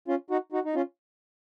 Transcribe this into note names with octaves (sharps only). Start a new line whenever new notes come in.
C#4 F4
D#4 F#4
D#4 F#4
D#4
C#4 F4